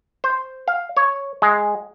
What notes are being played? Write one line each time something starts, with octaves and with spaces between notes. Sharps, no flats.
C5
F5
C#5
G#3